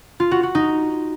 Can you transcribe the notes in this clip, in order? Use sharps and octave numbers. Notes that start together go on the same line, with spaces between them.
F4
F#4
F#4
D#4